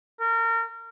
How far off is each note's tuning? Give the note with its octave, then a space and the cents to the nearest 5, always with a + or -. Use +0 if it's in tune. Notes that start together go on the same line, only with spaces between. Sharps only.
A#4 -30